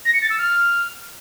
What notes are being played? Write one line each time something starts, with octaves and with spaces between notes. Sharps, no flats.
A#6
C#7
A6
E6
F6